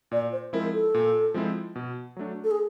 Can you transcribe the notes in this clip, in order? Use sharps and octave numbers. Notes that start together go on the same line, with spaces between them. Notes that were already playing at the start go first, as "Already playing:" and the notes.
A#2 D5
C5
F3 G#3 C4 E4 A#4
A4
A#2
F3 G#3 C4 E4
B2
F#3 A3 D4
A4
G#4